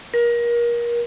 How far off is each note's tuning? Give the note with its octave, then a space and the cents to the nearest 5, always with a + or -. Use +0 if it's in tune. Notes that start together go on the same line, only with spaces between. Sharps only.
A#4 +30